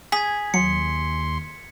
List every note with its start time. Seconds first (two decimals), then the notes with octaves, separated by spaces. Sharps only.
0.12 G#4 D#6 G#6 B6
0.54 D#2 F#3 C6 C#7